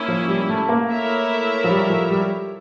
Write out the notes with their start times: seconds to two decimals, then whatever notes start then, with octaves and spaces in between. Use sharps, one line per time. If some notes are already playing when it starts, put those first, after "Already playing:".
Already playing: A#3 C#4 E4
0.08 F3
0.28 G3
0.49 A3
0.69 A#3
0.89 A3 E4 A#4 C#5 E5
1.64 F3
1.70 G3
1.90 F3
2.10 G3